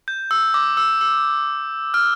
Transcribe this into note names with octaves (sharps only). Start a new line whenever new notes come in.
G6
E6
D6
E6
E6
F6